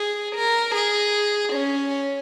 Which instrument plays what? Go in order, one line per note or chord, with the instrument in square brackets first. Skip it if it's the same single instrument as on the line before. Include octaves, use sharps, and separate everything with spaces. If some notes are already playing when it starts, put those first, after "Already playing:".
Already playing: [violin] G#4
A#4
G#4
C#4